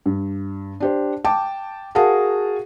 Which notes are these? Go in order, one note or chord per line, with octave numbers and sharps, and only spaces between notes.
G2
D4 G4 C5
G5 A5 D6
F#4 G#4 A#4 F5 F#5 A5